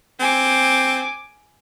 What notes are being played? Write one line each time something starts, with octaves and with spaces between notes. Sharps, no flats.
C4 G#5 D6